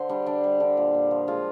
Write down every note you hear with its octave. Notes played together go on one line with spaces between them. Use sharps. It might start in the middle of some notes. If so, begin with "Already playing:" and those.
Already playing: D3 C5
G3 D4
D3 D4
G3
D3
A#2
A#2
F3
G#3 F4